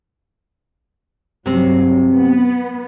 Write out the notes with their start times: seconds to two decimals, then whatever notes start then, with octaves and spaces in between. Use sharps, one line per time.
1.46 G2 C3 F#3 C4
2.13 B3